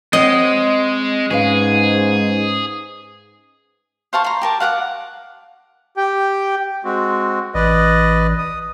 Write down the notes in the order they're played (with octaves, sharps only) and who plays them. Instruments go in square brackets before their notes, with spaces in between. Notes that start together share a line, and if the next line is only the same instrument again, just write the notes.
[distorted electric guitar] G#3 [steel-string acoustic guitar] C4 C#5 F#5 [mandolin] D#5
[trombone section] G#2 [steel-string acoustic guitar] C#4 B4 F5 [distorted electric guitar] G#4
[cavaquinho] C5 F5 A5 C#6
A#5 C6
G4 A#4 A5
F5 F#5 A5 D6
[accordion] G4 G5
G#3 C4 F#4
[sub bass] A1 [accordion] B4 D5 D#5
[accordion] D#6